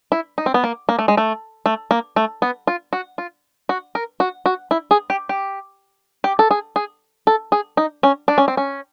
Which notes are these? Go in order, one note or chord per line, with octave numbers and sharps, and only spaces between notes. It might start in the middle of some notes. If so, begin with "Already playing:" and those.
E4
D#4
C4
B3
A#3
A#3
A3
G#3
A3
A3
A#3
A3
B3
F4
F#4
F4
F#4
A#4
F#4
F#4
E4
G#4
G4
G4
G4
A4
G#4
G#4
A4
G#4
D#4
C#4
D4
C#4
C4
C#4